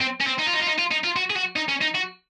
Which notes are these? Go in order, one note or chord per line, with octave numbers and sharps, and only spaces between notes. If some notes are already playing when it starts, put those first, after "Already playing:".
C4
C#4
C4
D#4
F4
D#4
F4
D#4
F4
D#4
F4
F#4
G#4
F#4
D#4
C#4
D#4
F#4